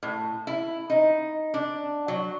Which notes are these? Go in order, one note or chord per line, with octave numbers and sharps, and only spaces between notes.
A2
E4
D#4
D4
F#3